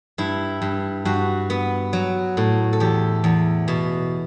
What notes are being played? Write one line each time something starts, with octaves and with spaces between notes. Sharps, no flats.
G2 E4
G2
G2 F#4
B3
F#3
A2
A4
E2 G4
E2
B2